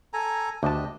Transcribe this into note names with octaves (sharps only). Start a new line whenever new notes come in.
A4 G#5 A#5
D2 D4 G4 D#5 A5